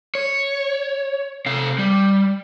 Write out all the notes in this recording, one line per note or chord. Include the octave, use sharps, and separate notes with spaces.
C#5
C3 F5
G3